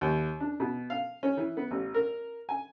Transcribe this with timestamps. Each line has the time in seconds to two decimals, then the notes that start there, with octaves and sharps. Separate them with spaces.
0.01 D#2
0.40 D4
0.60 B2
0.90 F5
1.23 C#4
1.37 E3
1.57 B3
1.71 A1
1.94 A#4
2.49 G#5